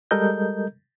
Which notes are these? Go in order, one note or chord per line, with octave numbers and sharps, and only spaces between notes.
G3 G#3 A4 A#4 D#5 G6